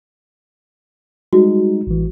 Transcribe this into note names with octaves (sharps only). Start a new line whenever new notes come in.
G3 G#3 D#4 F#4
A1 E3